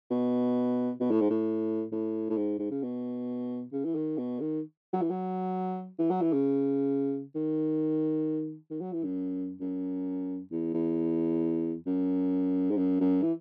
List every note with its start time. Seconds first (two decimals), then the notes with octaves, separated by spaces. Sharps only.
0.11 B2
1.00 B2
1.11 A2
1.21 G#2
1.30 A2
1.92 A2
2.30 A2
2.37 G#2
2.59 G#2
2.71 C#3
2.83 B2
3.72 C#3
3.85 E3
3.95 D#3
4.18 B2
4.40 D#3
4.93 F#3
5.02 E3
5.10 F#3
5.99 E3
6.10 F#3
6.21 E3
6.33 C#3
7.35 D#3
8.70 D#3
8.81 F#3
8.93 E3
9.04 F#2
9.60 F#2
10.51 E2
10.74 E2
11.86 F#2
12.70 G#2
12.77 F#2
13.00 F#2
13.23 E3